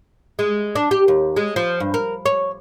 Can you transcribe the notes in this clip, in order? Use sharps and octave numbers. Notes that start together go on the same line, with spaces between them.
G#3
D4
G4
D#2
G#3
F3
G2
A#4
C#5